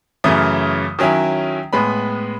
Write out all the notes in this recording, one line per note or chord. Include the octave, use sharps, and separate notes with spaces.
F#2 C#3 E3 A3 D#6
D#3 F#3 C#4 E4
A2 G#3 B3 B5